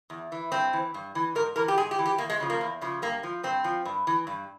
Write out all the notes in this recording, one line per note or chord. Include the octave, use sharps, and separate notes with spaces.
E2
E3
G2 C4
E3
G2
E3
G#2 A#4
E3 A#4
G4
G#2 G#4
G4
E3
G4
E2 A#3
G#3
C#3 F3
A#3
E2
C#3 F3
G2 A#3
F3
G2 C4
F3
G2
E3
G2